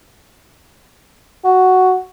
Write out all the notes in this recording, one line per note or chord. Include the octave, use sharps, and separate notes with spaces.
F#4